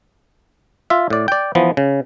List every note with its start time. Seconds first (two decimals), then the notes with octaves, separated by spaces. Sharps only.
0.90 F4 E5
1.10 A2 D5
1.28 D5 G5
1.55 E3 F3 B3
1.77 C#3